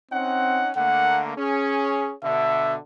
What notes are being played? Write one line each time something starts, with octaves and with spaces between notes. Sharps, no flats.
C4 C#4 D#4 F#5
D3 A3 A#3 F#5
C#4 G#4
B2 D3 E5